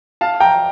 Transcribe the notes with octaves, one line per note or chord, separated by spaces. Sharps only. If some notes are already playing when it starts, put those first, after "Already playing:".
F5 A5
G5 A#5